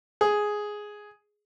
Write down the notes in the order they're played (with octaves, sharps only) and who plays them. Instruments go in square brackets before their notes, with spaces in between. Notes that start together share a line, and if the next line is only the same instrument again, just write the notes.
[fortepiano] G#4